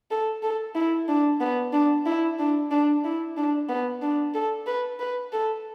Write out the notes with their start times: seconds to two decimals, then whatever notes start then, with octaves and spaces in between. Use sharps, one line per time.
0.11 A4
0.43 A4
0.75 E4
1.09 D4
1.41 B3
1.73 D4
2.06 E4
2.39 D4
2.71 D4
3.04 E4
3.37 D4
3.69 B3
4.02 D4
4.34 A4
4.67 B4
5.00 B4
5.33 A4